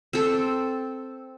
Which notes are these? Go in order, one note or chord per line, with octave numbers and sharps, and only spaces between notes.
C4 A4